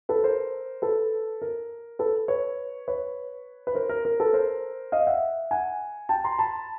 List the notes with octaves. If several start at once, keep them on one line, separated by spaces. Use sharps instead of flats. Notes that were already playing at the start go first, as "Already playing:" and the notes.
A4 B4
A#4 C5
A4 B4
A#4
A4 B4
B4 C#5
B4 C#5
B4
A#4 C5
A#4
A#4
A4 B4
A#4 C5
D#5 F5
E5 F#5
F#5 G#5
G5 A5
A#5 C6
A5 B5